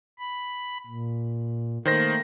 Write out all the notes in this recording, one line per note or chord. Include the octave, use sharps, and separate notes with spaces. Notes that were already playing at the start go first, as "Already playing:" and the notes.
B5
A#2
D#3 A3 A#3 C5 A#6